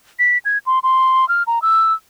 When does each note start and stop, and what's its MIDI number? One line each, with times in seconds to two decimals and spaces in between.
0.19 0.38 95
0.45 0.58 92
0.66 0.79 84
0.83 1.28 84
1.29 1.43 89
1.47 1.62 82
1.62 1.93 88